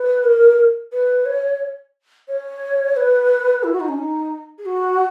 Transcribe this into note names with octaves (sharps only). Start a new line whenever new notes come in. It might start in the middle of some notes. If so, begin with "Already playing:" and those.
Already playing: B4
A#4
B4
C#5
C#5
B4
E4
F#4
D#4
C#4
D#4
G#4
F#4